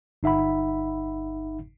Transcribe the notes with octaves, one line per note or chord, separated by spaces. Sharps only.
G1 D#4 E5 F#5 B5